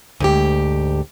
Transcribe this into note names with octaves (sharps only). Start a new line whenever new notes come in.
D2 G#2 G4